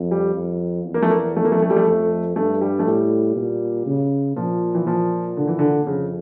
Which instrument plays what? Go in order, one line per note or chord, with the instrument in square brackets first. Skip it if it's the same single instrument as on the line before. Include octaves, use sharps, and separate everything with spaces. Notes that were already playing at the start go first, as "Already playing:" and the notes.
Already playing: [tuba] F2
[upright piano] G3
[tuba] F2
E2
[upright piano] A#3
A3
A#3
A3
A#3
A3
A3
G3
A3
[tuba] F2 [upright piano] A3
[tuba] G2 [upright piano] A3
[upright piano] G3
A3
[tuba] A2 [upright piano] G3
[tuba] A#2
C#3
[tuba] A#2 [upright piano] F3
[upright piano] E3
[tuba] A#2 [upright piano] F3
[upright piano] D3
E3
D3
[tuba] F2 [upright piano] C#3